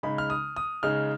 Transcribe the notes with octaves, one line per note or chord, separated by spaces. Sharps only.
C#3 G#3 D#4 B5
F6
D#6
D#6
C#3 G#3 D#4 F6